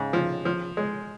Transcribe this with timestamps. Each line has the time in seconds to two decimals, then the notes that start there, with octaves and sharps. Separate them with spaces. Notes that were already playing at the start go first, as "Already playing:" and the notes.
Already playing: G#2 C#3
0.13 F3
0.45 F3
0.77 G#3